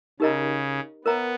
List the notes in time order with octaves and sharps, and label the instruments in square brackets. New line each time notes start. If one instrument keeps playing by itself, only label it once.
[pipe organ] C#3 [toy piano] D#4 G4 A#4 D#5 A#5
[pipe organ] B3 [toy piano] A#4 C#5 E5 A#5